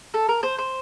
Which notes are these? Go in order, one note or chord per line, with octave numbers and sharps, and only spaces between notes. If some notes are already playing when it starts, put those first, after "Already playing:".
A4
A#4
C5
C5